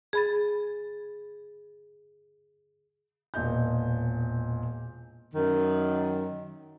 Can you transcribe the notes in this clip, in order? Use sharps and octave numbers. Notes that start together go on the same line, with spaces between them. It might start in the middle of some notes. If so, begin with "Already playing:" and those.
G#4 B5 A6
E1 A#2 D#5 G6
F#2 D#3